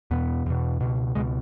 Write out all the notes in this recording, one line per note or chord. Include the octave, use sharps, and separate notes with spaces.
E2 B2 B3
E2 B2
C#2 B2
C#2 B2 G#3